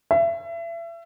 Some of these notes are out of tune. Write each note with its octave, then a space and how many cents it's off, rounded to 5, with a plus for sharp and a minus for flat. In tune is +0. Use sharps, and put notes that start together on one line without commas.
E5 +30